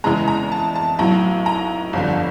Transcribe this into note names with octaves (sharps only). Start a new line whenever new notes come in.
E2 C#3 E3 G#3 A#5
A#5
A5
A5
B1 A2 F#3 A#5
A#5
G1 F2 D3